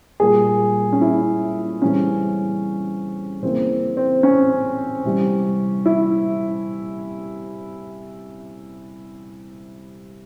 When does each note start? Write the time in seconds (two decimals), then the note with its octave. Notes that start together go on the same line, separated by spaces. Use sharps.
0.20 A#2 G3 A#3 G#4
0.93 C#4
1.01 E4
1.82 C#3 E3 G3 C4 C#4
3.42 C#3 E3 A#3 C4
3.97 C4
4.23 C#4
5.05 C3 E3 G3
5.86 E4